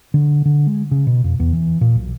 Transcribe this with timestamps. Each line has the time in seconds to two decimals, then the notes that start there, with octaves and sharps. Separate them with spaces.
0.14 D3
0.45 D3
0.67 G#3
0.91 C#3
1.07 B2
1.24 F2
1.40 E2
1.53 E3
1.81 A#2
1.96 B1